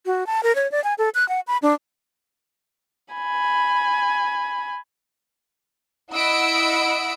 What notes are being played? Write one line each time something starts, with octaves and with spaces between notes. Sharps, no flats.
F#4
A5
A#4
C#5
D5
G#5
A4
F#6
F#5
B5
D4
G#5 B5
E4 D#5 F#5 B5 E6 D7